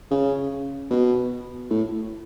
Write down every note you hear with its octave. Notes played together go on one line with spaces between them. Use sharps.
C#3
B2
A2